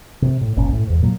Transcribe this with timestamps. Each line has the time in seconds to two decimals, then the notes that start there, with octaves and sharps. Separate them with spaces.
0.22 C3
0.41 A2
0.56 F#1 B1 A#2 C#4
0.73 A2
0.88 E2 G#2
1.02 A#2 F#3